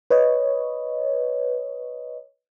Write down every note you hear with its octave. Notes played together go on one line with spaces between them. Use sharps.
B4 C#5 D#5